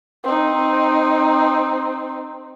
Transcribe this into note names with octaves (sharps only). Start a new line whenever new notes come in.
C4 D#4